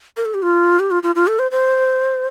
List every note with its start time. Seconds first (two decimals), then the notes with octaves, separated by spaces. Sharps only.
0.17 A#4
0.25 A4
0.34 G4
0.42 F4
0.79 G4
0.91 F4
1.03 F4
1.15 F4
1.27 A4
1.39 C5
1.51 C5